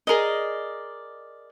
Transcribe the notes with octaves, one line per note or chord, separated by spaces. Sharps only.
G#4 A#4 D5 D#5